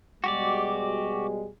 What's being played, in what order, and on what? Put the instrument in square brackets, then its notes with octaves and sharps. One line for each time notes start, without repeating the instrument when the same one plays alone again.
[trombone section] B2 G3 G#3 [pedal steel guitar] F#4 G4 D5